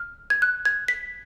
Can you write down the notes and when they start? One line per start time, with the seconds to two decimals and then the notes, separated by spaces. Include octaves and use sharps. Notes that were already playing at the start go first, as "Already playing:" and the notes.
Already playing: F6
0.30 G#6
0.42 F#6
0.65 G#6
0.88 B6